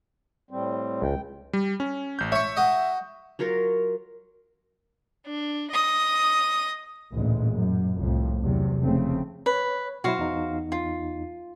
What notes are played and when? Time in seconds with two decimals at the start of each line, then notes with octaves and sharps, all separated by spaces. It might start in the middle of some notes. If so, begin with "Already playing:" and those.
0.51 A2 G3 C4
1.02 C#2 G5
1.53 G3
1.80 C#4
2.19 A1 G6
2.32 C#5 E5 C#6
2.57 F#4 D#5
3.39 F#3 F4 A#4 C#5
5.26 D4
5.71 D#5 D#6
7.14 A1 D2 A#2 C#3 G#3
7.51 F#2
7.99 C2 F2 A2
8.42 E2 C3 F#3
8.80 F1 C#3 A3 C4
9.46 B4 C#5
10.04 B2 F#3 E4 F#4 C5 F5
10.18 E2 D#4
10.72 F4